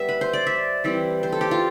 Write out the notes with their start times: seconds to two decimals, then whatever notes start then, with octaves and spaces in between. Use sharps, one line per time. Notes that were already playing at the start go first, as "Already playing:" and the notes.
Already playing: G3 B3 E5
0.09 B4
0.21 C5
0.33 D5
0.47 E5
0.84 E3 G3 C4 E4
1.23 C5
1.32 A4
1.41 G4
1.51 F4